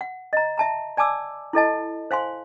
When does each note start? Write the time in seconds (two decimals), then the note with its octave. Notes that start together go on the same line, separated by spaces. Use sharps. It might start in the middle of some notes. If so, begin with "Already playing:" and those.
0.01 F#5
0.33 D#5 A#5
0.58 E5 A5 A#5
0.97 D5 G#5 A5 D6 E6
1.53 E4 A4 D#5 A5
2.11 C5 F5 G#5 C6